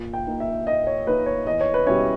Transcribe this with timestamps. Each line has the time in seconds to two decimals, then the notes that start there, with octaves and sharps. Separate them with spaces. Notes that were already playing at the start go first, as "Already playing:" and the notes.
Already playing: A#2
0.13 G5
0.27 A#3 D#4
0.40 E5
0.67 A#2 D#5
0.87 C#5
1.06 A#3 D#4 B4
1.26 C#5
1.47 E2 D#5
1.61 C#5
1.74 B4
1.86 B2 G3 C#4 E4 C#5